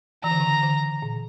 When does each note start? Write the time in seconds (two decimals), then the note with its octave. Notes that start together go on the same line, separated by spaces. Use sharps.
0.24 E3 A#5
0.31 D3
0.40 C#3
0.47 D3
0.63 D3
1.02 A#2